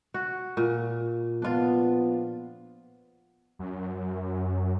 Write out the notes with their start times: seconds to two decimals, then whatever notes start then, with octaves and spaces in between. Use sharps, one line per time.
0.14 F#4
0.57 A#2
1.42 F3 B3 D4 F4
3.59 F#2